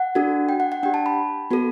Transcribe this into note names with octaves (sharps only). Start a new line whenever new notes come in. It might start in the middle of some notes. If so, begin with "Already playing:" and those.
Already playing: F#5
D4 F#4 A4
G5
F#5
F#5
D4 G4 G5
A5
B5
B3 F#4 A4